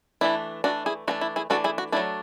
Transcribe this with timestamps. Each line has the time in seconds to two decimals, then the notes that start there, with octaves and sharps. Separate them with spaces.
0.21 E3 A3 D4 E4
0.64 E3 A3 D4 F#4
0.86 E4 G#4
1.08 E3 A3 D4 F#4
1.21 E4
1.36 E4 G#4
1.50 E3 A3 D4 F#4 A4
1.64 E4 G#4
1.78 F#4
1.92 F#3 A3 D4 E4